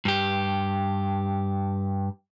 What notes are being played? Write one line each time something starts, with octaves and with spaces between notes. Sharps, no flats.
G2 G4